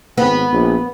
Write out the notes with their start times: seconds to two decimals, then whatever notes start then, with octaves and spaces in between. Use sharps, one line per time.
0.17 G#1 B3
0.52 A#1